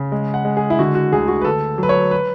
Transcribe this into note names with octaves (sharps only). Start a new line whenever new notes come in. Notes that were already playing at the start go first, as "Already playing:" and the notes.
Already playing: C#3
G#3
F#5
G#3
G#4
E4
D3 F#4
F#4
D2 G#4
F#4
B4
D2 A4
F#3 B4
C#5
B4